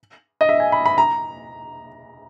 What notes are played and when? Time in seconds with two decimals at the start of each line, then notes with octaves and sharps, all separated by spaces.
0.41 D#5
0.49 E5
0.60 G#5
0.72 B5
0.86 B5
0.98 A#5